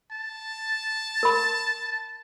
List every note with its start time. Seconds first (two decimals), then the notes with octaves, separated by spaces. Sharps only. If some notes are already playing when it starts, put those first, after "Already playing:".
0.12 A5
1.23 A#4 B5